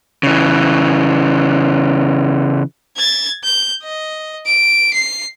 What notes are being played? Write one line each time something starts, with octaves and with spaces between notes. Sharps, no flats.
C#3 E3
G#6 A6
G6
D#5
D7
C7